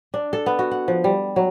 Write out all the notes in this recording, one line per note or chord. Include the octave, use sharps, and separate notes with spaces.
D4
A4
B3
F#4
F#5
F3
G3
F#3